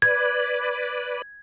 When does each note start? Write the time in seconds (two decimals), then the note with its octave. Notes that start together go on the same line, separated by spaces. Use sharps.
0.02 B4 D5 G#6